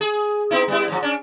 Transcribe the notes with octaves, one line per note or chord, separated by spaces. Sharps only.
G#4
B3 D#4 E4
G3 B3 E4
G#2 F3
C#4 D4